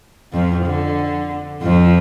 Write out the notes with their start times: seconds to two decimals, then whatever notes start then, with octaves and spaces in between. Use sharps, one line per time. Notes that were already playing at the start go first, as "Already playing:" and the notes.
0.33 F2 F3
0.66 D3
1.63 F2 F3